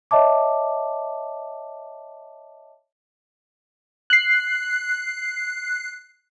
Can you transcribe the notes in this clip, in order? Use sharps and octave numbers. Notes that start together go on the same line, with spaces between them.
C#5 D#5 E5 A5 D6
F#6 C7